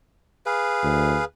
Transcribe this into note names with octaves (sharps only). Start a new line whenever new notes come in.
G#4 B4 F5
D2